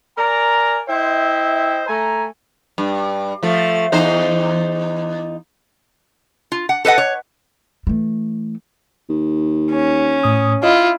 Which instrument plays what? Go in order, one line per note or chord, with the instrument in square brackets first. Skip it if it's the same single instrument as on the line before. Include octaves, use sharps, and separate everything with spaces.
[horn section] A#4 D5 G#5 A#5
E4 C5 D#5 E5 G5
A3 G#5 A#5
[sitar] G2
F3 A3
E2 D#4 C5
[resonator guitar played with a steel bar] F4
F#5
A4 B4 D#5 F#5
C#5
[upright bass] E3 A3
[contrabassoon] D#2
[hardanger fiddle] C#4
[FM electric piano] A2 D#6
[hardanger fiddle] E4 [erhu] F4 [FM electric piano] D#5